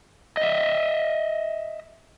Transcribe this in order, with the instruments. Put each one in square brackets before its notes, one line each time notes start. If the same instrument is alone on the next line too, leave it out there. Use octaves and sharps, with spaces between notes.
[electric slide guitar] D#5 E5